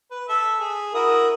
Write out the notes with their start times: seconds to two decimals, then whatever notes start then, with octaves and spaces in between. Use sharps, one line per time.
0.11 B4
0.29 A4 E5
0.60 G#4
0.94 E4 F#4 A#4 D#6